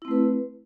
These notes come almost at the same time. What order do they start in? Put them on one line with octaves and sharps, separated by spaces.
E4 C4 A3 B4